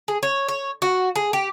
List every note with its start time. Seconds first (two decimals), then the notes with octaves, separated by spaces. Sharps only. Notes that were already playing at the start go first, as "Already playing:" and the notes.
0.08 G#4
0.23 C#5
0.49 C#5
0.82 F#4
1.16 G#4
1.33 G4